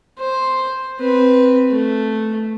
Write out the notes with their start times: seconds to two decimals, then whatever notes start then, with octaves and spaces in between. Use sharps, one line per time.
0.19 C5
0.99 C4 B4
1.70 A3